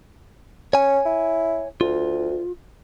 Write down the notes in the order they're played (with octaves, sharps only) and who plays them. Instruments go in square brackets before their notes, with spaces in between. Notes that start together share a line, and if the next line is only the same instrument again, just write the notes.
[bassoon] C#4 [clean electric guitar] C#5 G#5
[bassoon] E4
[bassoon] D2 [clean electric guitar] F4